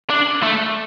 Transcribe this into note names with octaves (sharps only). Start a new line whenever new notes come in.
D4
A3